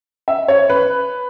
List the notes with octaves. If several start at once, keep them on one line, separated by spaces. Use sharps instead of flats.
E5
C#5
B4